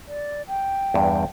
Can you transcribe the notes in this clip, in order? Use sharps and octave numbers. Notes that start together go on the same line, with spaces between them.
D5
G5
E2 G2